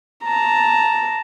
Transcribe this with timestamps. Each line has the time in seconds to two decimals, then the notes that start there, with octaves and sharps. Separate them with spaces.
0.24 A5 A#5